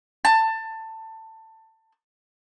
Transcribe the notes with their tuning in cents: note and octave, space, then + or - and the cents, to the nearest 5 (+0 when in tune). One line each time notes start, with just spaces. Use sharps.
A5 +20